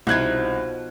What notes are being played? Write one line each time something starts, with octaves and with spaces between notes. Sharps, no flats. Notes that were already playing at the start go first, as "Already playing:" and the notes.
C2 B2 F3 D#4 F#6 G#6